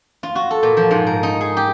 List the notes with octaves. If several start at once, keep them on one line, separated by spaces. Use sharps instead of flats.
F4
F#4
A4
A#2
F3
G#2
A#4
D#4
G#4
G4